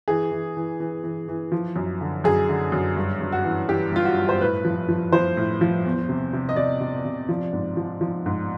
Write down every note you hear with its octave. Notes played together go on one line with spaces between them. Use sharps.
E3 G#4
E3
E3
E3
E3
E3
F3
F#2
D3
F#2 G#4
D3
F#2
G2
G2
F#4
E3
E3 G4
G2 F4
F#4
G2
C5
A2 B4
F3
F3
F3 C5
A2
F3
E2
C3
C3
D#5
C3 D5
C3
C3
F3
G#2
F3
F3
G#2